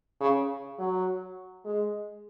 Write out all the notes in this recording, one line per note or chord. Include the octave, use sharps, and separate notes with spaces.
C#3
F#3
G#3